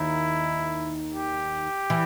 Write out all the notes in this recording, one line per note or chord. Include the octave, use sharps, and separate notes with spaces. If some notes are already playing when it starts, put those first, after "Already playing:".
Already playing: D#2 D#3 E4
G4
E3